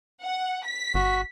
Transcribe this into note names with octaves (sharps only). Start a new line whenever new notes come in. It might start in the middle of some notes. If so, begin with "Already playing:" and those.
F#5
B6
G1 F#4